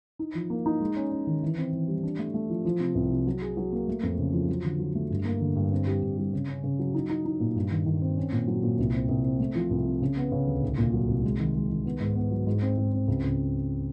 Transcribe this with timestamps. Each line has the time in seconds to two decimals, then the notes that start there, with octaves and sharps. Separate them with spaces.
0.19 D#4
0.35 F3
0.50 A#3
0.66 D#4
0.80 G#3
0.96 C#4
1.11 C#4
1.27 D#3
1.43 E3
1.58 C4
1.73 E3
1.88 G3
2.03 D4
2.19 A3
2.34 A3
2.50 F3
2.65 F3
2.80 C3
2.95 C2
3.11 C3
3.26 F#3
3.42 G#4
3.57 F#3
3.72 A#3
3.88 A3
4.03 F2
4.18 C#3
4.33 F3
4.49 F#3
4.64 D3
4.79 F#3
4.95 A3
5.10 G2
5.25 A#3
5.41 D3
5.56 G2
5.72 C4
5.87 G3
6.03 G2
6.18 G3
6.33 C#3
6.48 C#4
6.64 C#3
6.79 F#3
6.94 D#4
7.10 D#4
7.25 D#4
7.40 A#2
7.56 G2
7.71 D#3
7.86 D#3
8.02 C4
8.17 C#4
8.32 A#2
8.47 F#3
8.63 A#2
8.79 C2
8.94 C4
9.09 C2
9.25 C4
9.40 A3
9.55 F3
9.71 C2
9.86 C3
10.02 C#3
10.17 B3
10.32 C#3
10.47 D2
10.63 C2
10.78 A#2
10.93 F#3
11.09 C2
11.24 G#3
11.39 D#3
11.55 G#3
11.70 D#3
11.85 B3
12.00 G#2
12.16 B3
12.31 F#3
12.47 G#2
12.62 C4
12.77 G#2
12.93 C4
13.08 C#2
13.24 C#2